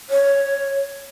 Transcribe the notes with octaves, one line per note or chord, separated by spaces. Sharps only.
C#5